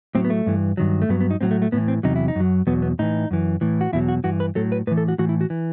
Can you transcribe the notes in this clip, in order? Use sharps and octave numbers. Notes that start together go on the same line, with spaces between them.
A2 F#3 C4
B3
A3
G2 E3
G2 D#3 F#3
A3
G2 F#3 B3
B3
D#4
A2 F#3 C4
A3
A3
A2 E3 B3
C4
E2 C3 F#3 D#4
E4
D#4
F#2 F#3
E2 B2 F#3 B3
B3
A2 E3 D#4
F#2 E3
A2 E3
F#4
E2 B2 F#3 E4
F#4
G2 E3 F#4
B4
A2 F#3 A4
B4
A2 E3 B4
A4
F#4
A2 E3 F#4
E4
F#4
E3